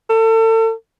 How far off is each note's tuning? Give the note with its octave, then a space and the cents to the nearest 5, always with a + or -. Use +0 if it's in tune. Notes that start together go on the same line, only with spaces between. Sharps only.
A4 +35